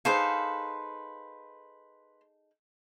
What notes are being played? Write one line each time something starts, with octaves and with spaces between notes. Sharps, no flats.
D#4 G#4 A4 B4 C5 F5